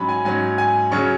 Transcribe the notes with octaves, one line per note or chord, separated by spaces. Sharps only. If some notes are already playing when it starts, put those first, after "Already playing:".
Already playing: G#2 F#3 C#4 B5
G#5
G#2 F#3 C#4 G#5
G#5
C#3 F#3 C#4 C#6